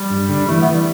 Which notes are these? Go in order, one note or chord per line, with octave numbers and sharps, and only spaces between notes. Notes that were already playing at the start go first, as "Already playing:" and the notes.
Already playing: G3
G2
D3
E3 A3
B3
E3
G3